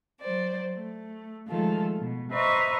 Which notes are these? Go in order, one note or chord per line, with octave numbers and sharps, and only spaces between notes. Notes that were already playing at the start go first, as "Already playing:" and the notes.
F#3 C5 D5
A3
D#3 F3 G#3 A3 F4 A4
B2
B4 C5 D#5 E5 A#5 C#6